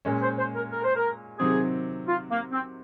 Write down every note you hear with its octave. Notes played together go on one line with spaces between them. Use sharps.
A#2 G#3 C#4
C5
C5
A#4
A#4
C5
A#4
C3 D#3 F#3 C4 G#4
F4
A#3
C4